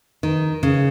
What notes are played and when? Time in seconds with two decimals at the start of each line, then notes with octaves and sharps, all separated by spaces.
0.23 D#3
0.63 C#3